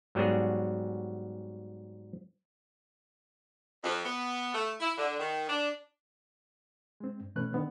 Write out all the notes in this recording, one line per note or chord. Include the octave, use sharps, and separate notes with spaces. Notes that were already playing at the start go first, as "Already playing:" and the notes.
G#2 F#3 G3 B3 F#4 G#4
F2
B3
A3
E4
D3
D#3
D4
G#3 C4
G2
B2 E3 A3 C#4 B4 F#6
D3 D#3 B3 C4